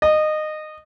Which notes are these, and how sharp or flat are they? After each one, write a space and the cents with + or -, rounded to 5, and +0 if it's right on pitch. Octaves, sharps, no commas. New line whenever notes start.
D#5 -20